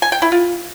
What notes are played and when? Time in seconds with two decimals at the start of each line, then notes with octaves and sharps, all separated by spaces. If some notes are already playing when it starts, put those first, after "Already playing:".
0.02 G#5
0.12 G5
0.22 E4
0.32 F4